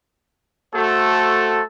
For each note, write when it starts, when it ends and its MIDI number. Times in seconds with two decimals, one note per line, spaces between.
0.74 1.61 57
0.74 1.61 66
0.74 1.61 69
0.74 1.61 72